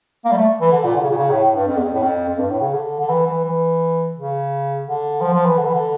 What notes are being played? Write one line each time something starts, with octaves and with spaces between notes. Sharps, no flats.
A#3
G3
A3
E3
D3
A#2
D3
C#3
A#2
C#3
A2
A2
G2
F2
E2
F2
A2
F2
F2
G2
A2
C#3
D3
D3
E3
E3
E3
C#3
D3
F3
F3
E3
D3
E3
D3